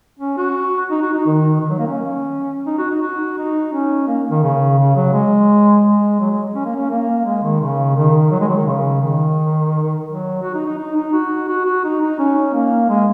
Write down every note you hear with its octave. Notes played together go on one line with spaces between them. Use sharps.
C#4
F#4
D#4
F#4
D#4
D#3
D#3
F#3
A#3
C#4
D#4
F#4
D#4
F#4
D#4
C#4
A#3
D#3
C#3
C#3
F#3
G#3
G#3
F#3
G#3
C#4
A#3
C#4
A#3
G#3
D#3
C#3
D#3
F#3
G#3
F#3
D#3
C#3
D#3
F#3
F#4
D#4
D#4
D#4
D#4
F#4
F#4
F#4
D#4
D#4
C#4
A#3
G#3